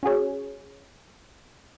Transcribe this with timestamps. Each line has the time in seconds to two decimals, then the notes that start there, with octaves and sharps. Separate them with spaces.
0.03 C#4 F#4 G#4 C#5